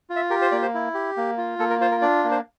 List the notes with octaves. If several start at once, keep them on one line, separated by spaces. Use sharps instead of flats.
F4
E5
G4 A#4
C5
A#3 D5
C5
E4
G4
A#3
F4
A#3 A4
A#4
F4 C5
A#4
D4 D5
A#3
C5